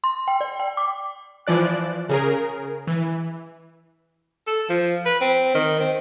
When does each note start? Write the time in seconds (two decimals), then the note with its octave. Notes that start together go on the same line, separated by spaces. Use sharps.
0.04 C6
0.28 G5
0.41 D5
0.60 G5
0.77 D6
1.47 E3 F3 D5 F#6
2.09 C#3 G#4 A#4
2.87 E3
4.47 A4
4.70 F3
5.05 B4
5.21 C4
5.55 D#3
5.80 C4